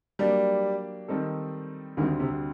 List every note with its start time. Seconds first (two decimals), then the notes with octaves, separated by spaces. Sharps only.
0.19 F#3 G3 A#3 D4 G4 D5
1.08 D#3 G3 C4 D#4 A4
1.97 D2 D3 D#3 G3 C4 F#4
2.20 C3